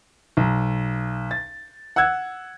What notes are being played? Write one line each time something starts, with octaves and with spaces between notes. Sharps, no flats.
B1
A6
F#5 E6 F#6 G#6